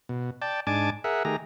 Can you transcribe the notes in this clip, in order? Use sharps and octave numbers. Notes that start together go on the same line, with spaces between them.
B2
D5 G5 A5
G#2 D4 G#5 A5 D6
G#4 A#4 E5 F#5
D#3 A3 G4 G#4 A#5